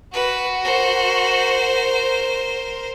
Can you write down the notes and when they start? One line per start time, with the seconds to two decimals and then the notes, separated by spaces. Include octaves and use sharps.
0.13 F#4 B4
0.62 A#4 C5